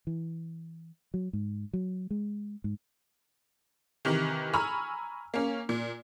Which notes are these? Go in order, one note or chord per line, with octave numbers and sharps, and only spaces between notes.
E3
F#3
G#2
F#3
G#3
G#2
C3 D#3 E3
G#5 A#5 B5 C#6 E6 F6
A#3 C#4
A#2